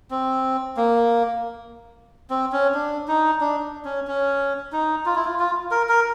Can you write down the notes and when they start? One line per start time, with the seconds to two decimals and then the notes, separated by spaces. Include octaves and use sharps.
0.11 C4
0.77 A#3
2.30 C4
2.52 C#4
2.74 D4
3.08 D#4
3.41 D4
3.85 C#4
4.07 C#4
4.72 D#4
5.06 F4
5.16 E4
5.25 F4
5.39 F4
5.71 A#4
5.89 A#4